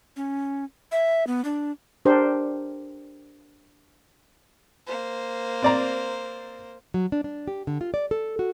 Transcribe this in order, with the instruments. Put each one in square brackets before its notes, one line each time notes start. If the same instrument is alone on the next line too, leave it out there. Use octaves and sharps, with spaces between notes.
[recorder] C#4
E5
B3
D4
[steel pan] D4 G4 A#4 C5
[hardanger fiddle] A#3 C5
[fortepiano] C4 D5 A#5
[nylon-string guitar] F#3
D4
D4
G4
D3
F4
D5
A4
F#4